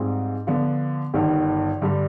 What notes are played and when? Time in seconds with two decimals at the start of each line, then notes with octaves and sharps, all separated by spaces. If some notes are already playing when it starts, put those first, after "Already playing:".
Already playing: G#2 G3 C4 F4 G#4
0.47 D3 F3 B3 F4
1.14 G1 G2 D#3
1.82 G2 D3 G3